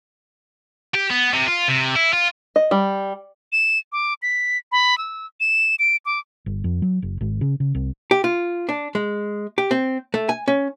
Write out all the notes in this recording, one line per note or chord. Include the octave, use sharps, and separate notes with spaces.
G4
B3
C3
F4
C3
E4
F4
D#5
G3
E7
D6
B6
B5
E6
E7
D7
D6
G1
F2
F#3
F#1
G#1
C#3
C#3
C2
G4
F4
D4
G#3
G4
C4
A3
G#5
C#4